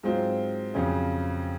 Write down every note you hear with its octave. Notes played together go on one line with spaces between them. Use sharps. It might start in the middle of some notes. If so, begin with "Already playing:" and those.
G#2 F#3 C4 F4
F2 C#3 F#3 C#4